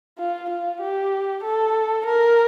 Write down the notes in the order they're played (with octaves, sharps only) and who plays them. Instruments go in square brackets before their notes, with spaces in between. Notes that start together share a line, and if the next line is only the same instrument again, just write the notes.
[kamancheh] F4
F4
G4
A4
A#4